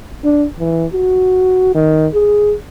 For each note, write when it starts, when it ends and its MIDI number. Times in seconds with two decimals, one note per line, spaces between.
0.24 0.46 62
0.59 0.86 52
0.93 1.72 66
1.74 2.07 51
2.14 2.55 68